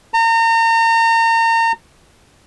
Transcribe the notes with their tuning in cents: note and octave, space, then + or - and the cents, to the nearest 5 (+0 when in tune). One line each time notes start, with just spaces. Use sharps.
A#5 -35